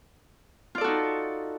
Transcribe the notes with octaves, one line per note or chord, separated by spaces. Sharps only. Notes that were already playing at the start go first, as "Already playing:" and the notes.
D#4 F4 F#4 A4 D5